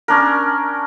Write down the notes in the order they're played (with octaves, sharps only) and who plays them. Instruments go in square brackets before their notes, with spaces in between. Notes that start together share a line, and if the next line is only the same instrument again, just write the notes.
[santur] C#4 D4 A#4